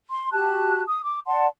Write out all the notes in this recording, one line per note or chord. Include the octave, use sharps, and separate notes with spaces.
C6
F#4 G4 A5 F#6
D#6
D6
D5 F#5 A5 C6